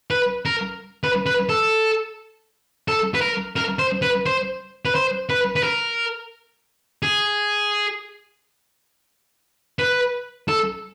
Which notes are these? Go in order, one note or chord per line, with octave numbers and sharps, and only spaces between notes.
B4
A#4
B4
B4
A4
A4
B4
A#4
A#4
C5
B4
C5
B4
C5
B4
B4
A#4
G#4
B4
A4